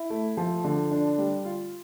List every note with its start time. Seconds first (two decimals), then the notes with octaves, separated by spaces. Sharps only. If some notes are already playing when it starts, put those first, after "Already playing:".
Already playing: E4
0.10 A3
0.37 F3
0.64 D3
0.91 D4
1.18 G3
1.45 F4